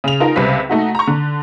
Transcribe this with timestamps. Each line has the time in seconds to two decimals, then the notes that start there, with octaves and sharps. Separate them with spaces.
0.04 C#3 F7
0.20 D#4 F4 A#4
0.36 C#2 C3 G3 B4 F5 B6
0.69 A3 D#4 F#4
0.95 A#5 C#6
1.07 D3